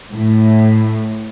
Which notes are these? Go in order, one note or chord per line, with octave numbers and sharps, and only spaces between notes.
A2